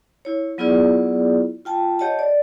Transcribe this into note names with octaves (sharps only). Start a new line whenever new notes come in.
E4 C#5
F#3 B3 E4 F4 G#4 D5
F4 G5 A5
G4 C#5 D#5 F#5 A5
D5